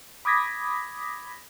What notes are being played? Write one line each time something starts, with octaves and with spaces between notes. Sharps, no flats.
B5 D6 D#6 G#6 A#6 B6